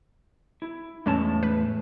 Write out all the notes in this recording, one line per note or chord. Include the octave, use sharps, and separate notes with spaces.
E4
E2 A2 G#3 C#4 A5
B4